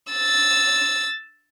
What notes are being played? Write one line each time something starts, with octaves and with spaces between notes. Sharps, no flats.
E6 A6